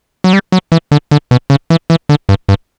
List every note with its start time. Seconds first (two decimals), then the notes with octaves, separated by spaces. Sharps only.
0.24 F#3
0.33 G3
0.52 F#3
0.72 E3
0.91 D3
1.11 D3
1.31 B2
1.50 C#3
1.70 E3
1.90 E3
2.09 D3
2.29 G2
2.49 G2